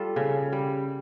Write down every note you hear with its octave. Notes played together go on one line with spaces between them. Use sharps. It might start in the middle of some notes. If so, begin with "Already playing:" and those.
Already playing: G3 F4 A4
C#3
G3